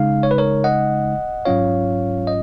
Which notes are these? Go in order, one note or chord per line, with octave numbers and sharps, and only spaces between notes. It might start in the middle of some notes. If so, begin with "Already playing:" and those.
Already playing: C#3 G#3 D#4 F5
C#5
B4
A#4 C#5
D#5 F#5
G#2 F#3 C#4 F4 C#5 F5
D#5